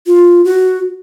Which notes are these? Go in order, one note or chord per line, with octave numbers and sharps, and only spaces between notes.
F4
F#4